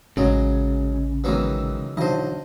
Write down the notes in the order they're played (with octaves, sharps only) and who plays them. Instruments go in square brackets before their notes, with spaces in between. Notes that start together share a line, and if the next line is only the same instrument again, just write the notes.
[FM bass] A1 [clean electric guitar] C#3 [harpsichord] F#3 G#3
[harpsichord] D#3 E3 F#3 [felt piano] G#3 B4
[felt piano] B1 D3 E3 [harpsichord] C5 D#5